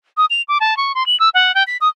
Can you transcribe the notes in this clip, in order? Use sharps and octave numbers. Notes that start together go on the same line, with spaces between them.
D#6
F7
D6
A5
C#6
C6
F#7
E6
F#5
G5
B6
D#6